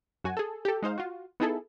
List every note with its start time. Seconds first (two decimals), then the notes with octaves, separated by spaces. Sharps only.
0.24 F#2 F#4 G#5
0.37 G#4 A4
0.65 G4 A4
0.82 G#3 D#4 C5 F5
0.98 F4 F#4
1.40 B3 D#4 E4 G#4 A4